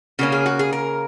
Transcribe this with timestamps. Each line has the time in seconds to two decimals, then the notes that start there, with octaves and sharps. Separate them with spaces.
0.19 C#3 A#3 C#4 F#4
0.32 G#4
0.46 F#4
0.59 G#4
0.73 A#4